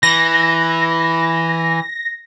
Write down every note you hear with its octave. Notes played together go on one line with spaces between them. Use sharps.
E3 A#6